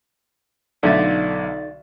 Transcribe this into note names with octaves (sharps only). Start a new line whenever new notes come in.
B1 D3 A3 D#4 F4 D5 E5 A6